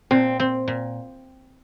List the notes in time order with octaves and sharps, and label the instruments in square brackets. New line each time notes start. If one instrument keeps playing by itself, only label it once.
[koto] A#2 [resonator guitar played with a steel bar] C4
[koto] C4
A#2